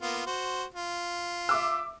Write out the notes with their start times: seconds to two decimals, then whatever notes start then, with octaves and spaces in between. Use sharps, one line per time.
0.02 A#3 B3 F4
0.26 F#4 C5
0.74 F4
1.49 E5 D6 E6